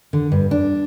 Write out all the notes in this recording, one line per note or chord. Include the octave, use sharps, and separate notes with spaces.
D3
G2
D4